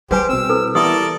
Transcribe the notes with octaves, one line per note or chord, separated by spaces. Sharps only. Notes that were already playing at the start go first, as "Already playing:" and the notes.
G3 G4 G#4 B4 C5 G#5
B2 C4 E6
E4 A4 B4
E3 B3 E4 G4 A4 A#4 D5 D#6